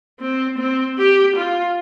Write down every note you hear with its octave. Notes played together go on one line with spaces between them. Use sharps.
C4
C4
G4
F4